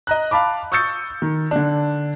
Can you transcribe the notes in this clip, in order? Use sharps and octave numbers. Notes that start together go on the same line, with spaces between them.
D#5 A#5 F#6
F5 A5 B5 D6
C#6 D#6 E6 G6 A6 C#7
D#3
D3 D4